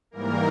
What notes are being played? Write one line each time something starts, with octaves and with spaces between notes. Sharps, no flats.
G#2 E3 G3 A#3 A#4